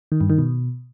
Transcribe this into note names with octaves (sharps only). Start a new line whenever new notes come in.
D#3
G2
D#3
B2